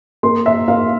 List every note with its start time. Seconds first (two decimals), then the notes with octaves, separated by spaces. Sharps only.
0.23 A#3 C6
0.46 E5
0.68 A#3 F5